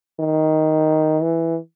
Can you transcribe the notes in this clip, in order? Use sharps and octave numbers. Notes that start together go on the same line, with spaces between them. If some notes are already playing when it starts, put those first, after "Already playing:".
D#3
E3